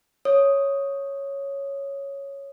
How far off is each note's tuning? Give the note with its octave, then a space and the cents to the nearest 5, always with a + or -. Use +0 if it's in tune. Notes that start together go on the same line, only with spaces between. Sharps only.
C#5 +0 D#6 +0